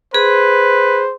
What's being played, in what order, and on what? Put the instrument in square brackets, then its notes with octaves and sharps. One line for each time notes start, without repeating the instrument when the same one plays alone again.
[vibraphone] G#4 [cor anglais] B4 [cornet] C5